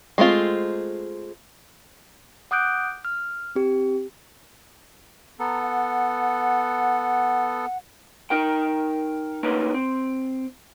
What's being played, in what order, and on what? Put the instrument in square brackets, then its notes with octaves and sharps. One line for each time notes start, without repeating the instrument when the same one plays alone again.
[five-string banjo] G#3 A3 C4 F4
[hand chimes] F#5 D6 D#6 F#6 G6 D7
F6
C4 G4
[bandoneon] B3 A4 [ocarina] A#5
[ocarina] F#5
[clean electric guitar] D#4 A#4 G5
A3 A#3 C#4 D#4 B4
C4